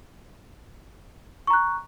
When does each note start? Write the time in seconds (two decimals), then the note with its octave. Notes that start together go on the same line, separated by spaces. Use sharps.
1.47 C#6
1.50 A#5
1.53 F#6